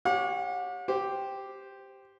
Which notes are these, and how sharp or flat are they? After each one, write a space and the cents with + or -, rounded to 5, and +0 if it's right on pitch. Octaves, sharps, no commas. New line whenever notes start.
G4 +0 C#5 +0 F#5 -40
G4 +0 C5 +0